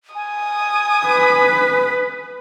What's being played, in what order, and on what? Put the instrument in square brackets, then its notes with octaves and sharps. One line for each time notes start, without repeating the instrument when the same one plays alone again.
[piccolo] G#5 [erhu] D#6
[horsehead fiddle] B4